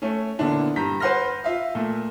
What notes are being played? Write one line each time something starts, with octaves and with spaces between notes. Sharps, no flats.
A3 C#4
A#2 D3 E3 B3 D4 E4
G2 A#5 G6 B6
B4 C5 F#5 C6 F6 A#6
F4 E5 F5
A#2 A3